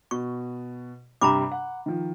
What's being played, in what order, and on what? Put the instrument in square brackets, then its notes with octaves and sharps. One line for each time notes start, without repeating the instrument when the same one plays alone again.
[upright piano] B2 [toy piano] C#6
[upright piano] G2 C3 G3 [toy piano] A#5 B5 D6
[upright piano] F#5
D#3 F3